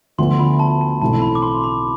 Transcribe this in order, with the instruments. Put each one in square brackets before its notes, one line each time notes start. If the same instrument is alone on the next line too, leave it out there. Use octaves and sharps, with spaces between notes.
[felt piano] D2 D3 F3 B3 [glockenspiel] C6
[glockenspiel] B5
A5
A5
[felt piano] B1 A2 E3 A3 C4 [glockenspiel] A5
[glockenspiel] B5
D6
C6
B5